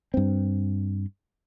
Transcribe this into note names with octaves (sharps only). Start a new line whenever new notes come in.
G2 C4